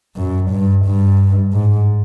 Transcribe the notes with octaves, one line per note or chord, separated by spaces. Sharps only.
F#2
G2
G2
G#2